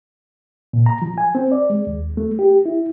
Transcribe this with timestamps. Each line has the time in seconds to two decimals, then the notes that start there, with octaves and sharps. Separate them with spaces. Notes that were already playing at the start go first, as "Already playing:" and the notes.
0.73 A#2
0.86 A#5
1.02 F3
1.18 G#5
1.35 C4
1.52 D5
1.70 G#3
1.87 D#2
2.17 A3
2.39 G4
2.66 E4